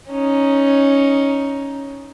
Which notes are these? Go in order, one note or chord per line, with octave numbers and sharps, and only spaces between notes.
C#4 D#4